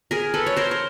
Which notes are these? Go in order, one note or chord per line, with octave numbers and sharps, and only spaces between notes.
G#4 A#4
A4 B4
C#5
A#4 C5
C5